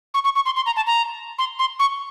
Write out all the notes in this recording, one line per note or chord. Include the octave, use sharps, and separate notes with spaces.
C#6
C#6
C#6
C6
C6
A#5
A5
A#5
C6
C6
C#6